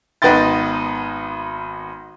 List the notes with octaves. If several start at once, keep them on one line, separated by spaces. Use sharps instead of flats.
G#1 B3 D#4 G5 C6 A6